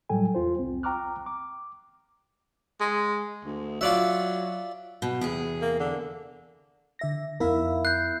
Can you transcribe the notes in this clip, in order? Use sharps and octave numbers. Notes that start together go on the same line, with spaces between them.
A2 F#3 G3 A4 G5 G#5
E2 F4 C5
C2 C4
G5 A#5 C#6 D6 F6 F#6
D6
G#3
D2
F#3 F4 D5 E5
B2
E2 C3 G#4
A#3
D3
D3 E5 A#6
F2 B3 E4 A#4 F5
F#6 G6 C7